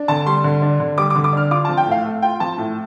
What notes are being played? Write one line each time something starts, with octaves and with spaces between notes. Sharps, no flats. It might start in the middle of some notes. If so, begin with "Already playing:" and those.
Already playing: D4
D3 A5
G3 C6
D3
D4
D3
G3 D6
D6
D3
D6
D4 F6
F4 D6
A5
F3
G5
A2 F5
A3
F4 G5
F3 A5
A2